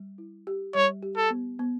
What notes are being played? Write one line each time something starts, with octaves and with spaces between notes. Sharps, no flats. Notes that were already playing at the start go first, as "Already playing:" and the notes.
Already playing: G3
E4
G4
G3 C#5
G4
A4
B3
B3